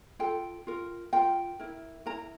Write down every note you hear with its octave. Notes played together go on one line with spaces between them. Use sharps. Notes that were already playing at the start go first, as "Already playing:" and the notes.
F4 A4 G5
F4 A#4
F4 A#4 G5
E4 A#4
E4 A#4 A#5